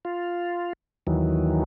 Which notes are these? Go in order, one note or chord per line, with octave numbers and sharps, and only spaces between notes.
F4
D#2 D#3 E3 F#3